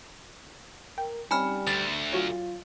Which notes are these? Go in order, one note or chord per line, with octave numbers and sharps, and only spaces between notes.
A#4 G5
G3 C4 C#4 D#4 G#5 B5 F6
D2 A6
F#3 F4 F#4 C#5